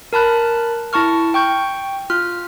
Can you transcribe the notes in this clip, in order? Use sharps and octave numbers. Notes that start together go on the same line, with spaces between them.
A#4 A5 B5 F#6
E4 A5 C#6 F6
G5 C#6 G6
F4 F6